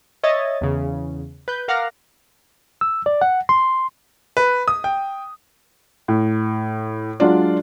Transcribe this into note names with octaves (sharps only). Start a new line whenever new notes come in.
C#5 D#5 E5 G#6 A6
E2 C#3
B4 G6
A#4 F5 F#5 D6 F6 A#6
E6
D5
F#5
C6
B4
D#6
G5
A2
F#3 G#3 D4 F4 D5